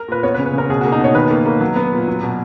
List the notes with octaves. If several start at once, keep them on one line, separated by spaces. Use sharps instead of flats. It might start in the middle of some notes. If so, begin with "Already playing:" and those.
Already playing: A#4
A#2 B4
B3 C#5
B4
C#3
B4
C#3 A#4
B2 G#4
A#3 F#4
D#4
B2 C#5
D#3 B4
A#3
A#3
F#3
B3
A#2
F#3
B2